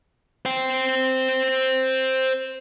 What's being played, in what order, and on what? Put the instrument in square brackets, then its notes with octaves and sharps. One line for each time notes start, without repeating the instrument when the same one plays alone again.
[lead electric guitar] C5 G5